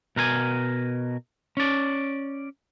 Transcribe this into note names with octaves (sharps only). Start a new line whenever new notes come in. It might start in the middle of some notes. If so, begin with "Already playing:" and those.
B2 A#4 C5 G#5
C#4 D5